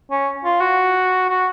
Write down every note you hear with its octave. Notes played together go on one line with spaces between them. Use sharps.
C#4
F4
F#4
F#4